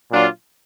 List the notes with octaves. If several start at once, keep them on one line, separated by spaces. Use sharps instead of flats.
A#2 F#3 D4 F4